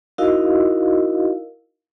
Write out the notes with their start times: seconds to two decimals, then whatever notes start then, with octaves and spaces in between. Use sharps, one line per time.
0.18 D#4 E4 F#4 A#4 D#5 F5